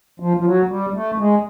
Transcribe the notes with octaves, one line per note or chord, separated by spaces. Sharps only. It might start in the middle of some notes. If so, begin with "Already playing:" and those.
F3
F3
F#3
G3
A3
G#3